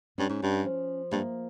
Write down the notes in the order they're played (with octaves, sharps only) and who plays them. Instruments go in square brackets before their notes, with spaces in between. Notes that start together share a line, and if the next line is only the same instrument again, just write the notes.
[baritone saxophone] G2 [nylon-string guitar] C#4
[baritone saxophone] G#2
G2
[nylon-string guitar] F3
[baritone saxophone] G2 [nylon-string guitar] A#3